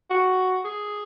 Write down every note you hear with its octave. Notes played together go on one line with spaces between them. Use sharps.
F#4
G#4